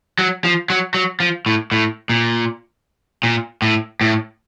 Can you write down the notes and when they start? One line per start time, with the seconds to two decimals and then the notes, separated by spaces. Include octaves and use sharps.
0.19 F#3
0.44 F3
0.70 F#3
0.94 F#3
1.20 F3
1.46 A2
1.72 A2
2.10 A#2
3.23 A#2
3.62 A2
4.01 A2